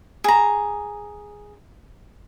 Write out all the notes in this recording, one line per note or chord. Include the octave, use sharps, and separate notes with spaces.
G#4 A#5